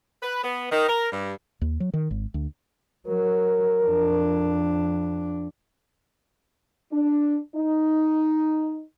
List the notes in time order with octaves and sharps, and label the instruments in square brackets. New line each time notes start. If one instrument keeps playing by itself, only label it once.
[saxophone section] B4
B3
D#3
A#4
G2
[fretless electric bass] D#2
F#3
D#3
G#1
D2
[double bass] F#3 [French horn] A#4
[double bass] F2 D4
[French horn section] D4
D#4